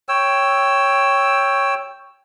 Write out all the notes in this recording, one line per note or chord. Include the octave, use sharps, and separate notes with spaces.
C#5 G5 E6